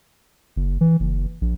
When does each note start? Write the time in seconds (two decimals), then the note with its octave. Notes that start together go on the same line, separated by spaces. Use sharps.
0.56 F#1
0.81 E3
1.00 F#1
1.41 A#1